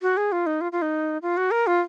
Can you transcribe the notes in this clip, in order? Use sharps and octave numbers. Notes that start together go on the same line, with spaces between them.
F#4
G#4
F4
D#4
F4
F4
D#4
F4
F#4
A#4
F4